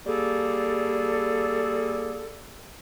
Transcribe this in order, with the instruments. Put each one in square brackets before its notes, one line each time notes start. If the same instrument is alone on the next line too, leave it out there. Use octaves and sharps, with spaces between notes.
[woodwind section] G3 A#3 G#4 A4